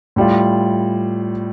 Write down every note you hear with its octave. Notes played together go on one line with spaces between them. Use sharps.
A2 G3 F4